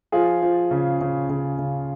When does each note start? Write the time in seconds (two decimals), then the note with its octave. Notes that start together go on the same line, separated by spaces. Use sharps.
0.12 F3 F4 G#4
0.42 F3
0.71 C#3
1.01 C#3
1.30 C#3
1.59 C#3